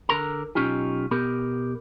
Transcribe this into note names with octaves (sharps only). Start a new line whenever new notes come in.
D3 A#4 A#5
B1 C#4 D#4 F4 G4
B2 B3 G4 A#4